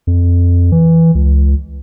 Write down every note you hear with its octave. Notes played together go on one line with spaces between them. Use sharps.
F2
E3
C#2